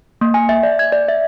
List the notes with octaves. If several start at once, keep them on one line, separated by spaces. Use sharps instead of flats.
A#3
G#5
E5
D5
G#6
D5
E5